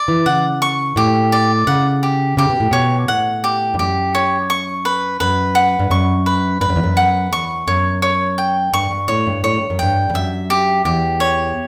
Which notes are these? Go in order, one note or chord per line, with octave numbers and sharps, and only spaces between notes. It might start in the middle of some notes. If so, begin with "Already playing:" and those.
Already playing: D5
E3
C#3 F#5
C#6
A2 G4
D5
C#3 F#5
G4
C#3 G4
B2
A2
B2 C#5
A2 F#5
G4
G2
F#2 G4
C#5
C#6
B4
F#2 B4
F#5
G2
F#2 C#6
B4
G2 B4
F#2
E2
F#2
F#5
E2 C#6
F#2 C#5
C#5
G5
G2 C#6
G2
A2 C#5
G2
A2 C#5
G2
F#2
G2 G5
G2
F#2 E5
G4
E2 G4
C#5